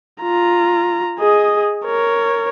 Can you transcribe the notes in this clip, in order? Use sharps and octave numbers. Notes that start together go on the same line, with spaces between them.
F4 A#5
G#4 D#5
A#4 C#5